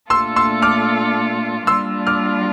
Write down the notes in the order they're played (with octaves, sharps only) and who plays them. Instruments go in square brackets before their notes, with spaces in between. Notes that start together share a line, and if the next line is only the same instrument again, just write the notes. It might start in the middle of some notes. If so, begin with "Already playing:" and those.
[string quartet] A#2 A3 D4 F4 A4 [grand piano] C6 E6
[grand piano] C6 E6
D6 F6
[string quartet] G3 A#3 D4 F4 [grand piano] C6 E6
[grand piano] D6 F6